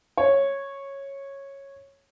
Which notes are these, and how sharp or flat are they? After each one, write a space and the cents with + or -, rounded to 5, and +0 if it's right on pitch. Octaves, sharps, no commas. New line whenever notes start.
C#5 -10